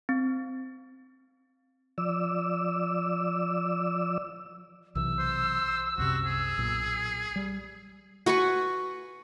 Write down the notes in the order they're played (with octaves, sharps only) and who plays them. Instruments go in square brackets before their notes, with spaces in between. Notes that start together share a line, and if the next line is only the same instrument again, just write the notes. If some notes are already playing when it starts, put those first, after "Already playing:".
[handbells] C4
[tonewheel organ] F3 D5 E6
[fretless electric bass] B1 C3 E3 [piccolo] E6
[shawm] C5
[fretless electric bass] C2 F#2 C3 [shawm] F#4
[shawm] G#4
[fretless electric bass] B1 A#2
G3
[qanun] F#4 B4 G#5 C#6